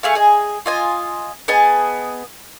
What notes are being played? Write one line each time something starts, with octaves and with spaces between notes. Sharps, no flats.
A3 G#4 F5
G#4 D#5
F4 D#5 G#5
B3 G#4 D#5 A5